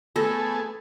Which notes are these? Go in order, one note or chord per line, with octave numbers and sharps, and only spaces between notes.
A3 B3 G#4 A4